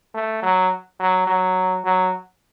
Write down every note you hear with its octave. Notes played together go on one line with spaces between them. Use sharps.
A3
F#3
F#3
F#3
F#3